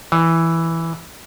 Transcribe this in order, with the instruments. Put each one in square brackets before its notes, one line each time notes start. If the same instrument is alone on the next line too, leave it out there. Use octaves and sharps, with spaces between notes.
[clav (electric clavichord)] E3